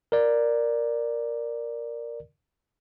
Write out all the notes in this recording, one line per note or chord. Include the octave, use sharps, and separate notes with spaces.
A#4 D5